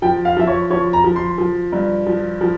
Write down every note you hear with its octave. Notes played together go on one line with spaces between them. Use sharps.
F3 G5
F5
F3 E5
C#5
F3 C#5
A#5
F3
C6
F3
G2
F3
F3